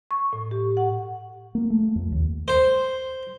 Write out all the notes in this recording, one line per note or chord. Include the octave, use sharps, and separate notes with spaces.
C#6
A2
G4
F#5
A#3
A3
F2
D#2
C5